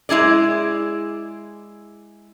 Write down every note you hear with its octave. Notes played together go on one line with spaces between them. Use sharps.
G#3 E4 G#4 D5